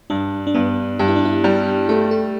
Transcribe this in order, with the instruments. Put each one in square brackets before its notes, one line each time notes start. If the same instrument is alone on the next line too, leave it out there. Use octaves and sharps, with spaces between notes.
[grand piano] G2 [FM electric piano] D4
[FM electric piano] D4
[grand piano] G2 [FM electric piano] B3
[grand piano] G2 [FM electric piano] G4
[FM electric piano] E4
D4
E4
[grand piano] G3
[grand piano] A3 [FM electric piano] G4
[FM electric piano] A4